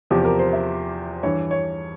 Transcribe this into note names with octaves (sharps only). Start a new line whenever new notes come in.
E2 C3 F3 G4
A#4
C5
E5
G2 E3 C#5
C#5